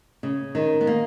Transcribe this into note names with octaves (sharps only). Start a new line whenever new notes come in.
C#3
D#3
B3
A#3